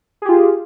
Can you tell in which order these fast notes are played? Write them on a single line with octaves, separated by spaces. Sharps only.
G#4 G4 F4